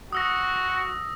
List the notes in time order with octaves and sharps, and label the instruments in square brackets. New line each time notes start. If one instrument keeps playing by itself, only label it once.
[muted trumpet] F#4 [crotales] D#6 E6 A#6